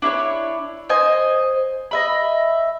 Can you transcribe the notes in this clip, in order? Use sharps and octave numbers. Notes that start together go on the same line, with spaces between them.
D4 E4 A#4 C#5
C5 D#5 G#5
D#5 E5 B5